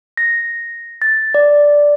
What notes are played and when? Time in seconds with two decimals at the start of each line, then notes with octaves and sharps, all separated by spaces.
0.17 A#6
1.02 A6
1.34 D5